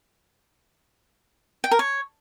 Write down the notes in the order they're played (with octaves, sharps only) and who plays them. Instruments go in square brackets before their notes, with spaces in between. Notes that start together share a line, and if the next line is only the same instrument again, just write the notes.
[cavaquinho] G5
A#4
C#5